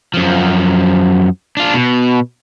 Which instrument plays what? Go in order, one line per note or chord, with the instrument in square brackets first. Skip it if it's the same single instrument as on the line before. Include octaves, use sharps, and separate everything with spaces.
[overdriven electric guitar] F#2 F3
D4 F4
B2